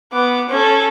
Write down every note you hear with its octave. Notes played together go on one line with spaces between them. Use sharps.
B3 D6
C#4 A4